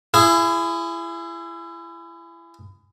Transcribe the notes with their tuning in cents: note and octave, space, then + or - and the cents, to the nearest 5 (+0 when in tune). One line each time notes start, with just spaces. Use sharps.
E4 +30 G#4 +0